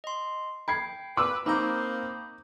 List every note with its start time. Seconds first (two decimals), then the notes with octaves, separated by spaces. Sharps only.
0.04 D#5 C6
0.68 G5 B5 G#6 C7
1.17 B4 D6 E6
1.46 A#3 C4 D#4 A#5 B5 C#6 D#6 G6